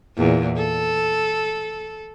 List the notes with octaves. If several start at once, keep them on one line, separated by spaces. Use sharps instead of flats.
E2 A#2
A4